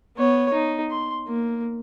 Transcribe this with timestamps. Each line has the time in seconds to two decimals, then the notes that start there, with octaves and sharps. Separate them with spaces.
0.17 B3 C#5
0.53 D#4
0.90 C6
1.27 A#3